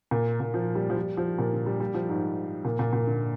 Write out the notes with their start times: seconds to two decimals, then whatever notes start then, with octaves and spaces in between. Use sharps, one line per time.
0.11 A#2
0.40 A#2
0.54 F3
0.75 G3
0.90 F3
0.96 G3
1.17 F3
1.39 A#2
1.52 D3
1.66 G3
1.80 G3
1.94 F3
2.09 G#2
2.65 A#2
2.79 A#2
2.93 A#2
3.07 D3